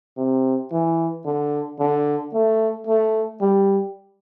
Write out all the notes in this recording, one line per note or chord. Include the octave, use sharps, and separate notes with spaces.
C3
E3
D3
D3
A3
A3
G3